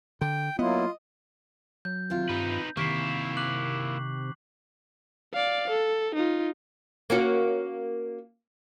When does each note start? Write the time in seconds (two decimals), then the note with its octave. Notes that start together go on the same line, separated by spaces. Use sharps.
0.21 D3 G5
0.59 F#3 A#3 B3 E4 F4 D#5
1.85 F#3 G6
2.10 C3 D#3 F4
2.29 G2 D#4 B4
2.77 C3 D#3 A#3 E4 C#6 B6 C7
3.37 D6 F#6 F#7
5.33 D5 F5
5.70 A4
6.15 D#4 F4
7.10 A#3 C#4 F#4